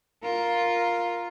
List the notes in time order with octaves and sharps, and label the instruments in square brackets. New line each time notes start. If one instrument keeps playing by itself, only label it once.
[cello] F4 A#4